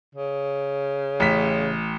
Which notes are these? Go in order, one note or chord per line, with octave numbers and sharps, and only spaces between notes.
C#3
A1 B6